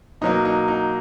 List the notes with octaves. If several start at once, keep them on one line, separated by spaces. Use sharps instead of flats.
B2 F#3 A#3 D#4
D#4
D#4